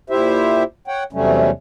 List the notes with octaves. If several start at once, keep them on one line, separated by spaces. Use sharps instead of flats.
A#2 E4 G4 C5 E5
C#5 F#5 G5
E2 C3 F#3 G3 A3 C#4